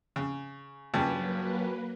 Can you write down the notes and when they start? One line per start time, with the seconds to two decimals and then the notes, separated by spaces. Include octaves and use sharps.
0.16 C#3
0.94 G2 C#3 F3 F#3 A#3 B4